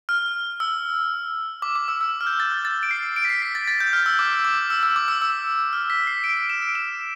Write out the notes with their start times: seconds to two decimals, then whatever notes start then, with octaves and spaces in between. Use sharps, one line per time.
0.09 F6
0.60 E6
1.62 D6
1.76 D6
1.88 E6
2.01 E6
2.21 F6
2.27 G6
2.40 A6
2.52 G6
2.65 A6
2.83 D7
2.91 C7
3.16 D7
3.25 B6
3.30 C7
3.42 B6
3.55 A6
3.68 A6
3.80 G6
3.93 F6
4.06 E6
4.19 D6
4.45 D6
4.70 E6
4.83 E6
4.96 D6
5.08 E6
5.22 E6
5.73 F6
5.90 B6
6.07 C7
6.24 D7
6.37 D7
6.50 E7
6.62 D7
6.75 E7